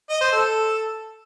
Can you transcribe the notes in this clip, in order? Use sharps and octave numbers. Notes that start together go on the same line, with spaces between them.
D#5
C5
A4